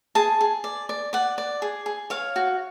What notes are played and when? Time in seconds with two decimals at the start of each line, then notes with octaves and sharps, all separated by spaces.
0.15 G#4 A5
0.41 G#4
0.64 D5
0.89 D5
1.13 D5 F#5
1.38 D5
1.62 G#4
1.86 G#4
2.10 C#5 F5
2.36 F#4